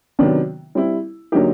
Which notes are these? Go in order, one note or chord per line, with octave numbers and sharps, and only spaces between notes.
C3 D#3 F#3 B3 D4
G3 C4 E4
D3 F#3 A#3 D#4 G4